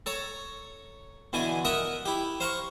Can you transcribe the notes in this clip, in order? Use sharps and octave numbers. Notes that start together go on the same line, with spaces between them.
A4 C#5 A#5
B2 D3 E3 G#5
A#4 D#5 E5 F#5
E4 G4
C5 F5 A#5 C#6